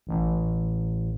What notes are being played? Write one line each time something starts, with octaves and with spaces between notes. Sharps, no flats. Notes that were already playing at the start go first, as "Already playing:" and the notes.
A1